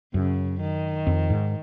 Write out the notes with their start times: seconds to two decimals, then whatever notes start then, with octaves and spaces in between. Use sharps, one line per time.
0.14 F#2 C#3
0.61 D#3
1.07 F2
1.30 G#2